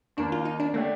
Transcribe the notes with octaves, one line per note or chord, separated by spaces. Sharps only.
D#2 D#3 A#3 D4
F4
D#4
D4
D3 A3 A#3 D4 G4